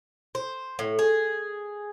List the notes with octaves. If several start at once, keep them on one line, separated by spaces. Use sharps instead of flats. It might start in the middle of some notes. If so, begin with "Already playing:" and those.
C5
A2
G#4